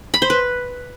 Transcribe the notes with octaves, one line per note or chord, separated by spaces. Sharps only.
B5
C5
B4